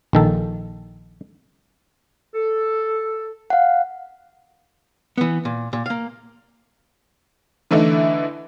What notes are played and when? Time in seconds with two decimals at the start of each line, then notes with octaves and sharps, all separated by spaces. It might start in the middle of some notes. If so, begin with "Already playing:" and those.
0.13 A#1 D#3 A4
2.34 A4
3.50 F5 F#5
5.18 E3 B3
5.45 A#2
5.73 A#2
5.86 A#3 F5
7.71 D3 E3 A3 D#4 E4